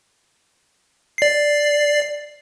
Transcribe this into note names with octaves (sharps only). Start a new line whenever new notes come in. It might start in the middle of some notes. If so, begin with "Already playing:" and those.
D5 C7